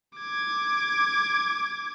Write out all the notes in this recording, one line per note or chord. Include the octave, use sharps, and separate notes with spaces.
D6 G#6